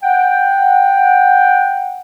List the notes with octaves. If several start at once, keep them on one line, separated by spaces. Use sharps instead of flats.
F#5 G5